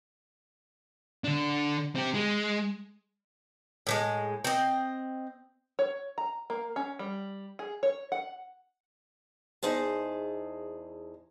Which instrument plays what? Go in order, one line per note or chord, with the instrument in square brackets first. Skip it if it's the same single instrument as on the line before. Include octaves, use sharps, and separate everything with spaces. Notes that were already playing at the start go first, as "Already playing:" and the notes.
[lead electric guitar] D3 D4
C4 G4
G#3
[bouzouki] A2 D3 G#3
C4 D#5
[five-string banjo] C#5
A#5
A#3
C#4
G3
G#4
C#5
F#5
[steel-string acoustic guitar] E2 D#4 G#4 C5 A5